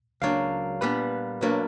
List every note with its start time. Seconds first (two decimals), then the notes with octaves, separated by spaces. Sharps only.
0.22 C#2 C#3 F#3 A#3 D4 F5
0.81 A#2 G3 B3 D4 B4
1.41 B1 B2 F#3 A#3 D4